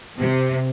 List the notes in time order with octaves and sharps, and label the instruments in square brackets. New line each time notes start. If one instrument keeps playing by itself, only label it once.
[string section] C3